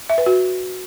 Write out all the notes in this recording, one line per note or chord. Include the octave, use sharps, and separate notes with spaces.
E5
B4
F#4